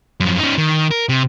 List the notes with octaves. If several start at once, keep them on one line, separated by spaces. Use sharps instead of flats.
F#2 F3
C#4 D#4
D#3
A#4
C3